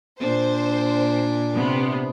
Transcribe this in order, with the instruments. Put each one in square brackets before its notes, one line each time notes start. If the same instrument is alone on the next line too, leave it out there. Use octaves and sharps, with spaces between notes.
[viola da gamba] A#2 D4 [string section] C5
[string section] C3 B3